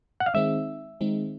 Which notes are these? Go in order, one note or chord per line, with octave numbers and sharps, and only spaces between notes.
F#5
F5
D#3 G#3 C4 D#4 E5
D#3 G#3 C4 D#4